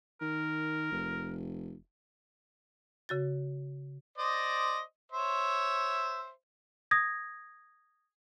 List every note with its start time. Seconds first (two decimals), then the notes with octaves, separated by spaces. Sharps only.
0.21 D#3 A#4
0.92 F1
3.09 C#3 F#4 A6
4.18 C5 D5 D#5
5.12 C5 C#5 E5
6.91 D#6 G#6 A#6